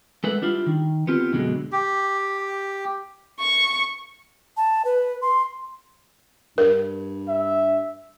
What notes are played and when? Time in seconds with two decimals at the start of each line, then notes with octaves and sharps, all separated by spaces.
0.24 G#3 A4 B4 E5 F#5
0.42 G3 D4 E4 F4
0.66 D#3
1.07 B3 C4 F4 G4
1.32 F#2 B2 D3 G#3
1.72 G4
3.41 C#6
4.57 A5
4.85 B4
5.22 C6
6.58 G2 A#4
7.28 E5